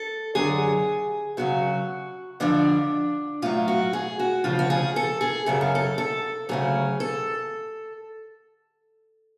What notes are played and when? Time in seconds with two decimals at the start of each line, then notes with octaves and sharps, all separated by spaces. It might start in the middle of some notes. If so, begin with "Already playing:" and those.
Already playing: A4
0.35 F#2 D3 F#3 G#4
1.37 F#2 C#3 F#3 F#4
2.40 F2 D3 F3 D4
3.42 A2 F#3 F4
3.68 F#4
3.93 G#4
4.19 F#4
4.44 D2 C#3 F3 F4
4.59 F#4
4.70 G#4
4.96 A4
5.21 G#4
5.46 F#2 C#3 F#3 A4
5.61 G#4
5.75 A4
5.98 A4
6.49 D2 C#3 F#3 G#4
7.00 A4